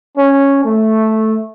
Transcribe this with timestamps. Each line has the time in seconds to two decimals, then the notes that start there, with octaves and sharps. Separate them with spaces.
0.18 C#4
0.65 A3